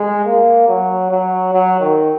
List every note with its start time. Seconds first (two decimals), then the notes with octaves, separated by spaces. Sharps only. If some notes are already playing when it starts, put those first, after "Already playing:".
Already playing: G#3
0.25 A#3
0.69 F#3
1.10 F#3
1.53 F#3
1.80 D#3